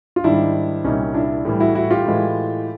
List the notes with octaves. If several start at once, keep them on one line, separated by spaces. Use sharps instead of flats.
F4
G#2 D#3 G3 D4 E4
C2 A#2 G3 C#4 D#4
D4 E4
A2 E3 G3
E4 F#4
E4 F#4
F4 G4
A2 E3 G#3